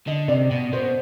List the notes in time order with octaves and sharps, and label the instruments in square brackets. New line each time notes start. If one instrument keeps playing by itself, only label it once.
[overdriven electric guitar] D3 [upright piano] D#5
[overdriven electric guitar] C3 [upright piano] D5
[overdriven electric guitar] B2
[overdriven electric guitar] B2 [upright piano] C5